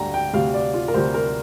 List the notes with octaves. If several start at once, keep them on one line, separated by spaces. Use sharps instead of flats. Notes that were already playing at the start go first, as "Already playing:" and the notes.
Already playing: D2 D3 G3 G5 A#5
G5
D2 C3 G3 F5
D5
F4
A#4
D2 C3 G3 C5
A#4